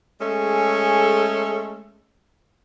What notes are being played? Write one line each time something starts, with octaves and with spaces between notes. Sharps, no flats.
G#3 A3 C#4 G#4 A4